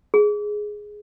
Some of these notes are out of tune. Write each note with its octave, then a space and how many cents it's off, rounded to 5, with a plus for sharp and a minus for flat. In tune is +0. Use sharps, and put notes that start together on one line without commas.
G#4 +5